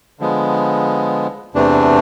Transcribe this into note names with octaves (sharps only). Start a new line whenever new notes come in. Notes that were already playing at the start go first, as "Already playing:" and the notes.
D3 F3 G#3 B3
E2 C3 E3 A3 D4